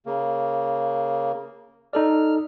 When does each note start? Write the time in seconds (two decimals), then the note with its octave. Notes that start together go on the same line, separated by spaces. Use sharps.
0.06 C#3 A#3
1.93 D#4 A4 D5 F6